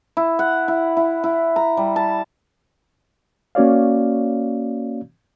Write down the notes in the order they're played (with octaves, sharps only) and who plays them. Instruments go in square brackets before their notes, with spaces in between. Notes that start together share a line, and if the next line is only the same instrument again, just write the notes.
[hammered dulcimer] E4
F#5
E4
E4
E4
A#5
G3
A5
[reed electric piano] A#3 C#4 F#4 C#5 D5 F5